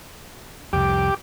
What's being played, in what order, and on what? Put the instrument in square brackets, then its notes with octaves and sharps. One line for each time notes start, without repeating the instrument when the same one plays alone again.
[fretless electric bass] C2 F2 [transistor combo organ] G4 D6